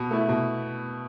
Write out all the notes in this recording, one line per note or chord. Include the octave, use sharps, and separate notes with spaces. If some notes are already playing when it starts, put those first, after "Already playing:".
Already playing: B2
A3 E4
B2